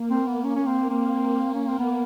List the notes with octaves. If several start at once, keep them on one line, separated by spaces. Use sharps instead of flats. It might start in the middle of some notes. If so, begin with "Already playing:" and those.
Already playing: A#3
C4
B3
C#4
C#4
C4
C4
C#4
C4
B3